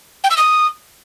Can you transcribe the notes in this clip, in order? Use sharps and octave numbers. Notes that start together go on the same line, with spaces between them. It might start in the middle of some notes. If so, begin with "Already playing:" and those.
G5
E6
D#6